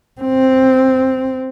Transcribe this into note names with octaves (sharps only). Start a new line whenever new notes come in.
C4